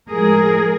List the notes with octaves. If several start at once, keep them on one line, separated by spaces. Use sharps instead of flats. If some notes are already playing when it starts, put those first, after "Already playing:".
A2 F3 G#3 G#4 A#4